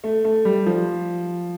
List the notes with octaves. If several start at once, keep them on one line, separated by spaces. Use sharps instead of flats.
A3
A3
G3
F3